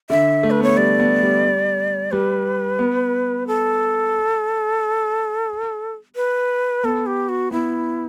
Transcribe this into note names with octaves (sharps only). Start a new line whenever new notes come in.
D3 E5
A3
B4
B3 C#5
A3
G3 D5
B3
G3
G3
G3 B4
B3
A4
B4
B3 A4
G4
F#4
B3 E4